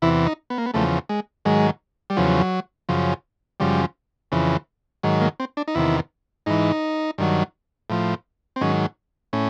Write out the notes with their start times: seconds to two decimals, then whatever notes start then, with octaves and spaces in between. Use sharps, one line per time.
0.02 E2 C3 E3 E4
0.26 D#4
0.50 B3
0.58 A#3
0.66 B3
0.74 E2 C#3 F3 A3
1.09 G#3
1.45 G#2 D#3 F#3 G#3
2.10 G3
2.17 E2 C#3 F3 F#3
2.89 F#2 C#3 F3
3.60 F#2 C#3 F3 G3
4.32 F2 C#3 E3
5.03 G#2 D#3 F#3
5.21 A#3
5.40 C4
5.57 D4
5.68 D#4
5.75 E2 C3 D#3 E4
6.46 G#2 E3 D#4
7.18 G2 D#3 F#3
7.90 A2 F3
8.56 C4
8.61 G#2 D#3 F#3 C#4
9.33 A2 C#4